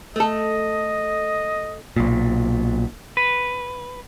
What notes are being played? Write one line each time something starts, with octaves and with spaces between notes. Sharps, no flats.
A3 A4 D#5
B1 A#2
B4